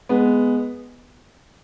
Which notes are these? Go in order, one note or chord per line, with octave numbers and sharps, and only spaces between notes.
G#3 B3